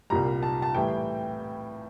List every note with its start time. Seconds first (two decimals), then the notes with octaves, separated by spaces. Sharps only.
0.10 C2 A#2 G3 A#5
0.43 A5
0.62 A5
0.75 A2 E3 G3 G5